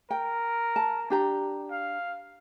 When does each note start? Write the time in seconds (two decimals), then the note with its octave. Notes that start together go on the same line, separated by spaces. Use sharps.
0.11 A#4 G5
0.76 A5
1.10 D4 G4 A#5
1.71 F5